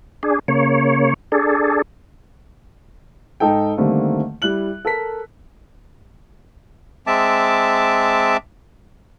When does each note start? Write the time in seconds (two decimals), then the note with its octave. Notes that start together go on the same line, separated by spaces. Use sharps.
0.23 D4 G#4
0.48 C#3 A#3 C#5
1.32 D4 G#4 A4
3.40 G#2 D#4 A4 G5
3.78 D3 D#3 G3 A3 A#3 C4
4.42 G3 E4 F#6 F#7
4.85 A4 A#4 B6
7.07 G#3 C4 E5 A5 D6